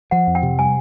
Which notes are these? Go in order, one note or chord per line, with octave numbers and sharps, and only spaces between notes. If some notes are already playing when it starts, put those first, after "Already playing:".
F3 F#5
F2
G5
C3
G3 G#5